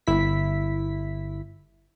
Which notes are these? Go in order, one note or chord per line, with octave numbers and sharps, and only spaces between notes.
G1 E4 B6